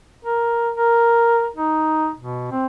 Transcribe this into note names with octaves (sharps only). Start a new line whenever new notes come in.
A#4
A#4
D#4
B2
C4